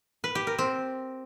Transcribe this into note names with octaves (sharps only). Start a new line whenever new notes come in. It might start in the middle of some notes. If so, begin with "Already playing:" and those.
B4
G4
A#4
C4